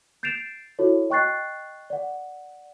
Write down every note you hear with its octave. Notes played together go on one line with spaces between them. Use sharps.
G6 A6 C7 D7 E7 F7
E4 F#4 A4 C#5
D#5 G5 C#6 F#6 A6 C7
D5 F#5